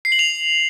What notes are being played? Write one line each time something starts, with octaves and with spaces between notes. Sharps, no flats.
C7
F#7
F7